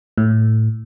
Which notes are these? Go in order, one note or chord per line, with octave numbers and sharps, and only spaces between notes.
A2